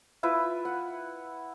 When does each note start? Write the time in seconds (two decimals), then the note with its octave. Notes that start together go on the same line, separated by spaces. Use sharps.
0.23 E4 F4 B4 E5
0.65 F#5